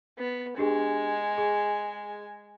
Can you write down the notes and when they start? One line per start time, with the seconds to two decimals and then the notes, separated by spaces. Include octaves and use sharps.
0.18 B3
0.58 G#3 D4 G4 G#4 G#5
1.38 G#4